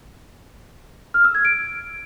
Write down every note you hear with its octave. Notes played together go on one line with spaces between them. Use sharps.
F6
E6
G#6
D7